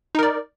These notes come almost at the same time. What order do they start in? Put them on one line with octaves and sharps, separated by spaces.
D#4 A#4 D5